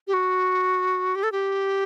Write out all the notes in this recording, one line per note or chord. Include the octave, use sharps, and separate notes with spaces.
G4
F#4
G4
A4
G4